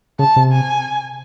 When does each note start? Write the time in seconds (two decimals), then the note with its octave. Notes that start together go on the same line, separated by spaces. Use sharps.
0.19 C#3 A5
0.36 C3
0.52 G#5